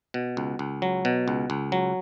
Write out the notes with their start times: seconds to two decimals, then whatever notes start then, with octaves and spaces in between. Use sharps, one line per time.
0.14 B2
0.37 C#2
0.59 C#2
0.82 F#3
1.05 B2
1.28 C#2
1.50 C#2
1.72 F#3